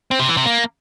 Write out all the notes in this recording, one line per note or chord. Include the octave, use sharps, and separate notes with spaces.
C4
C3
E3
C3
A#3